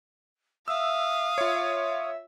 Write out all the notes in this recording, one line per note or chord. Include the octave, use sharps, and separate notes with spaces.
E5 F5 D#6 E6
F4 C#5 E5